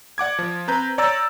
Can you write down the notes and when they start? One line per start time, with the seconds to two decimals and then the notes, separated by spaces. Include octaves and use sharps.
0.18 D5 F#5 D6 G#6
0.39 F3
0.68 C4 B4 A#5 G6
0.98 C#5 D5 A#5 E6 A6